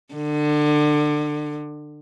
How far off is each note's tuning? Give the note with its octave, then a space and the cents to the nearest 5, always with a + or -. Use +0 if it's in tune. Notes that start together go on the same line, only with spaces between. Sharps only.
D3 +25